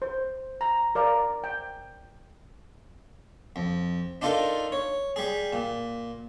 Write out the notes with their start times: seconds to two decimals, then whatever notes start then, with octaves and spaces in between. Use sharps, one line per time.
0.02 C5
0.61 A#5
0.95 A#4 D5 F5 A#5
1.44 G5
3.56 F2
4.21 D4 D#4 F4 A4 A#4
4.72 C#5
5.16 G3 G#4
5.53 A#2